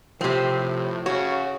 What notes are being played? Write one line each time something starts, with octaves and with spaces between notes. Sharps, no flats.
A2 C3 F3 C4 G4
C#3 F#4 C#5